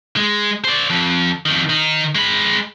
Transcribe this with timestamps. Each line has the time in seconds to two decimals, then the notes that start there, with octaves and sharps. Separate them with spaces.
0.17 G#3
0.65 C5 D5
0.90 F2
1.46 F2 D#3
1.70 D#3 D#4
2.15 G#3 B5